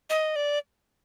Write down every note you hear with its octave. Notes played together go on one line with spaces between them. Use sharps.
D#5
D5